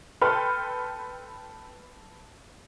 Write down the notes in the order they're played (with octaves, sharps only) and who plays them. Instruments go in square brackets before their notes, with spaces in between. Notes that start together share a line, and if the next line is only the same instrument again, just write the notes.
[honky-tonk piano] A4 B4 G5 B5 C6 F6